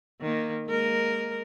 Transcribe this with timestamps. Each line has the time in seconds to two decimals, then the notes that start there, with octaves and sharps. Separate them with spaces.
0.21 D#3 A#3
0.68 G#3 A#3 A#4